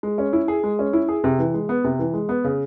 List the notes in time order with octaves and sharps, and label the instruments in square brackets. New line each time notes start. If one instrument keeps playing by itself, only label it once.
[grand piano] G#3
C#4
E4
G#4
G#3
C#4
E4
G#4
C3
E3
G#3
B3
C3
E3
G#3
B3
C#3